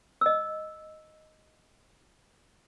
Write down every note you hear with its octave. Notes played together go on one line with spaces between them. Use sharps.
D#5 E6